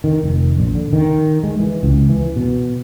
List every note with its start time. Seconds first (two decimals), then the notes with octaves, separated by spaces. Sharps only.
0.04 D#3
0.23 F1
0.58 A#1
0.75 D3
0.93 D#3
1.44 G#3
1.60 E3
1.83 C#2
2.09 E3
2.36 B2